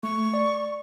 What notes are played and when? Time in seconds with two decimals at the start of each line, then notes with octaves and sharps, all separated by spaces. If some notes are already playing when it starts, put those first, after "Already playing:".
0.03 A3 C#6
0.34 D5